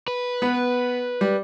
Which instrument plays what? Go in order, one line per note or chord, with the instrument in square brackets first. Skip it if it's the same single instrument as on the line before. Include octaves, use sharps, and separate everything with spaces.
[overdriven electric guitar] B4
[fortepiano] B3
G3